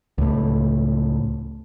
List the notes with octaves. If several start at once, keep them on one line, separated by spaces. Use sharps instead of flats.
C#2 A2